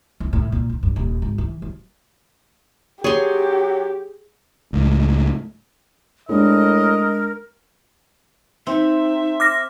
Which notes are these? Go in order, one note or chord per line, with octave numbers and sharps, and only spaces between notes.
F2
A2
A#2
D#3
G2
D#1
G#1
E3
F#3
F#3 G4 G#4 C#5 C6
C#2 A2
A2 G#3 D4 A#4 D#5
C4 D#4 E5
D6 F6 A#6